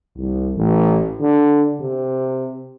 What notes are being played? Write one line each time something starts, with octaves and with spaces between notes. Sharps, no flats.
C2
A1
D3
C3